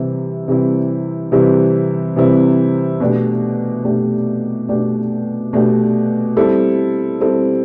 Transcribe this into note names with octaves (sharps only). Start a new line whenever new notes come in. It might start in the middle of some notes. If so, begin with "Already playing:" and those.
Already playing: C3 E3 G3 C4 E4
C3 E3 G3 C4 E4
C3 E3 G3 C4 E4
C3 E3 G3 C4 E4
B2 A3 D4 G4
B2 A3 D4 G4
B2 A3 D4 G4
B2 A3 D4 G4
G3 C4 E4 A4
G3 C4 E4 A4